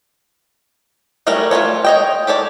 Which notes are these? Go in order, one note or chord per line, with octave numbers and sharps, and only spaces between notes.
F#3 G3 A3 C#4 A#4
A3 C4 F4 C#5
C#5 D#5 G5
G4 A4 C#5 D5